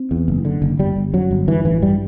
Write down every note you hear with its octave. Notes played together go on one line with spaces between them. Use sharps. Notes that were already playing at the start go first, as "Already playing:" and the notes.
Already playing: C4
E2
F#1
D3
F#1
G1 G3
G1
F#2 F#3
G1
G2 E3
A1 E3
G2 G3